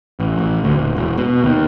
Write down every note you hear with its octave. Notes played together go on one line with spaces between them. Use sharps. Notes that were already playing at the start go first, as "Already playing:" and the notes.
A1
A1
D2
D#1
E1
B2
D#2